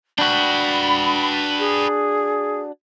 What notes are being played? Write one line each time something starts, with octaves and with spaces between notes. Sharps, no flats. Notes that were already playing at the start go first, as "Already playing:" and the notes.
D4 F#4 B4 G5 B5
G#4